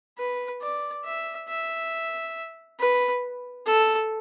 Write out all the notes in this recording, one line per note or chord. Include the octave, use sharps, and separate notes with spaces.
B4
D5
E5
E5
B4
A4